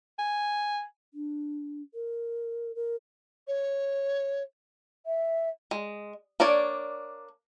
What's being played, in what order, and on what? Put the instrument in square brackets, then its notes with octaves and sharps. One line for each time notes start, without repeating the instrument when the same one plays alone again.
[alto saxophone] G#5
[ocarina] D4
A#4
A#4
[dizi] C#5
[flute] E5
[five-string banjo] G#3
A#3 D4 C#5 D5